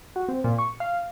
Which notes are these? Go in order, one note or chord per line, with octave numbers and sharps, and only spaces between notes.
F#4
C4
A#2
C#6
F5